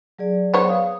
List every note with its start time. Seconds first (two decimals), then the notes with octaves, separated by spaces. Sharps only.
0.19 F#3 G#4 D5
0.54 B3 C5 C#5
0.68 F5 D#6